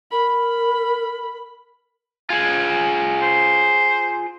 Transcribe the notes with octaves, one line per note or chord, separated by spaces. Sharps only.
A#4 B5
F4 G#4 G#5
C5